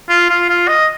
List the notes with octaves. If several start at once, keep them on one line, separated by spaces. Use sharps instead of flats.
F4
F4
F4
D#5